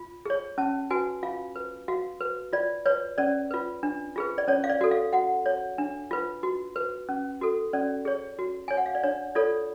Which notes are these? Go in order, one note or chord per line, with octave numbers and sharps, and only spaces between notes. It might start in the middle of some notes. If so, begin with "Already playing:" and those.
Already playing: F4
G#4 C#5
C#4 A5
F#4 B4 G#5
F4 F5
B4
F#4 F5
B4
F4 D5
B4 C#5
C#4 D5
F4 B4
D4
F4 G#4 B4
D5
C#4 C#5
F5
D5
F#4 A4
F5
F#4 F#5
C#5
D4
F4 B4
F#4
B4
C#4
F#4 A4
C#4 D5
G#4 C#5
F#4
C#5 G#5
F#5
F5
D5
D4 C#5
F4 A4 C#5 D5